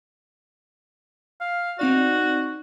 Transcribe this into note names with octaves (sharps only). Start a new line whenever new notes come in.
F5
C4 D#4 F#4 D5